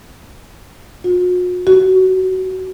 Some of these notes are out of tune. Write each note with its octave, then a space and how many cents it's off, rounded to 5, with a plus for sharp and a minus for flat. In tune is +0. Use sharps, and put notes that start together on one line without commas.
F#4 -45
F#4 +20